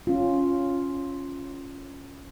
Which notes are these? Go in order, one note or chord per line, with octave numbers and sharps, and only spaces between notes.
C#4 F4